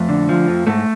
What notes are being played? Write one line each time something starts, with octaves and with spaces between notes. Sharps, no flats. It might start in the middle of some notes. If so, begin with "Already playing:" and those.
Already playing: F2 A3
D3
F3
F2
G#2 A3